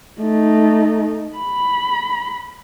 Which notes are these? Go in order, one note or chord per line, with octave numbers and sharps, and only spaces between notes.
A3 D#4
B5